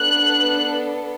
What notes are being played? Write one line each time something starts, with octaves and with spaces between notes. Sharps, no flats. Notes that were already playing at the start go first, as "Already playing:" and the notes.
Already playing: B3 D4 A4 F#6